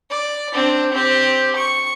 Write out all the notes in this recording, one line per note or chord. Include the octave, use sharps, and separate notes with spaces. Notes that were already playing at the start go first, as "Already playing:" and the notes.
D5
C4 D4
C4 G4
C#6